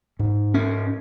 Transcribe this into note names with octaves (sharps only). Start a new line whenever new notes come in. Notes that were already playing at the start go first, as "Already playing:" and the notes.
G#2
C#4